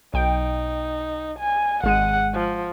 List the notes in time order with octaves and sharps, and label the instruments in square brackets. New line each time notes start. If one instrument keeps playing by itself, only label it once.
[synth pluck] B1 G5 D7 [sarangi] D#4
[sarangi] G#5
[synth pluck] G#1 G#3 D#7 [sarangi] F#5
[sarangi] F3